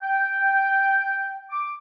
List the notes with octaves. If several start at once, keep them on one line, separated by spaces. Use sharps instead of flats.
G5
D6